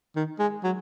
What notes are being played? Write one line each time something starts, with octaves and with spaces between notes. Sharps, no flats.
D#3
G#3
F#3